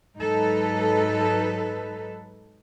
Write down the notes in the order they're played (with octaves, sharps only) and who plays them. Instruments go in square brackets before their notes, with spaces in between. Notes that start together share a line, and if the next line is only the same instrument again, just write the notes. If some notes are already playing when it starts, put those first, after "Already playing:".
[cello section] G#2 F#3 D#4 A4 B4